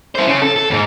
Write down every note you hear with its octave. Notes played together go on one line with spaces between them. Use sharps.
E4 C5
C#3
A4
A4
D#2 G#2